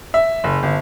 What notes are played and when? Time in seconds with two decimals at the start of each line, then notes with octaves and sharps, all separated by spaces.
0.14 E5
0.44 F#1
0.63 G1